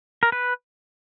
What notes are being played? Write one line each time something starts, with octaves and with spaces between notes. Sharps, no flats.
A#4
B4